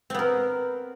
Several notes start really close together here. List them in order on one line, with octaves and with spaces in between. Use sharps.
C4 B3 A#4